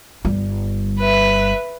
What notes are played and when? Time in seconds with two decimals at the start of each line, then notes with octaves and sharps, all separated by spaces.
0.25 G1 G3
0.99 B4 E5